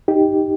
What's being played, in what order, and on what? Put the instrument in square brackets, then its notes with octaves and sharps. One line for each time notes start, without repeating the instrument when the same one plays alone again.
[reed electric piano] D#4 G4